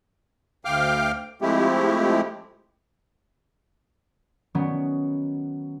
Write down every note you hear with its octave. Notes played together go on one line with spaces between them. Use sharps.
D2 F5 G5 D6 F6
F3 G#3 A3 C4 E4 G4
D#3 F#3 B3 C#4